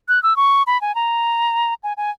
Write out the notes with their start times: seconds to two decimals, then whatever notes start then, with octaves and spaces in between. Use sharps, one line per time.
0.08 F#6
0.23 E6
0.36 C#6
0.67 B5
0.81 G#5
0.95 A#5
1.83 G#5
1.97 G#5